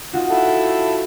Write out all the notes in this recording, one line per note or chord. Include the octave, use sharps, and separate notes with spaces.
D#4 F4 F#4
E4 A4